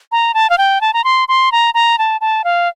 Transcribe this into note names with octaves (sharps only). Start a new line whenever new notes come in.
A#5
A5
F5
G5
A5
A#5
C6
C6
A#5
A#5
A5
A5
F5